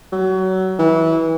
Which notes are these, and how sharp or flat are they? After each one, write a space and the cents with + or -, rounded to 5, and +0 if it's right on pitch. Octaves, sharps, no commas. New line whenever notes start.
F#3 +25
E3 -20